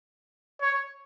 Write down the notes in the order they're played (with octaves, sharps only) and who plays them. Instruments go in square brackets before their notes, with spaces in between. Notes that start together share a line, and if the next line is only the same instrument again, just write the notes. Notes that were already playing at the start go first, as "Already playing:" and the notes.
[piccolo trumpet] C#5